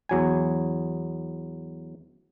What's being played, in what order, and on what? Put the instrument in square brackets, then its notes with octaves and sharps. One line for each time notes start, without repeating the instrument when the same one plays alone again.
[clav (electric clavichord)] E2 F#3 G#5